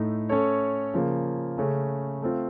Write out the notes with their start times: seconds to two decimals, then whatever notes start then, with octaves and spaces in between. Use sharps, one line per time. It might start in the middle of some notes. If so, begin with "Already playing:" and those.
Already playing: A2 A3 D#4
0.29 A3 C#4 A4 C#5
0.94 C#3 F3 A#3
1.58 C#3 A3 C#4
2.22 A3 C4 F4